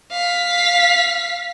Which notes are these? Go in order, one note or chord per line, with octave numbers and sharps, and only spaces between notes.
F5 B6